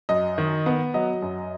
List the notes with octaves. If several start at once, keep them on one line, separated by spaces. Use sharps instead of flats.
F#2 D#5
D#3
B3
F#3 D#5
F#2